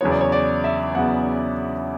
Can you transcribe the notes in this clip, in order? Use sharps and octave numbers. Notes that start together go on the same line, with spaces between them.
E2 C#3 F#3 B3 C#5
D5
C#5
D5
E5
E2 C#3 F#3 B3 F#5